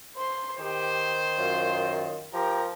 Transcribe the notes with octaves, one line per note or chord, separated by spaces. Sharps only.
C5 C6
D#3 G4 C5
F#2 F4
F3 G4 A#4 A#5